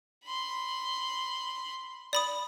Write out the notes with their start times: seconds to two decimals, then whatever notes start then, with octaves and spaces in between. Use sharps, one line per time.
0.25 B5 C6
2.13 D5 B5 D#6